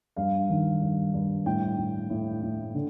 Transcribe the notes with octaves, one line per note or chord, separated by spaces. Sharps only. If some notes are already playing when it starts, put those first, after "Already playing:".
G2 F5
D#3
G2
G2
A2 G5
A2
A2
A2
D3